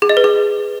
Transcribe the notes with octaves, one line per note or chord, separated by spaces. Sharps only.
G#4
D#5
B4
G#4